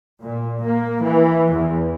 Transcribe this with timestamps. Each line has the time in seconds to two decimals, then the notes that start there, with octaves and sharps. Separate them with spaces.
0.22 A#2
0.64 A#3
1.03 E3
1.53 E2